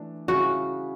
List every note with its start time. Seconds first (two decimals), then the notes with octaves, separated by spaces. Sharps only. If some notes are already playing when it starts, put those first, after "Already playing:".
Already playing: E3 A3 D4
0.28 C#3 G3 C#4 E4 F#4